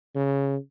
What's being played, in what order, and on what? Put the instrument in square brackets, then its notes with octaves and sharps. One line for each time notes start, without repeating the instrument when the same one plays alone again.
[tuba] C#3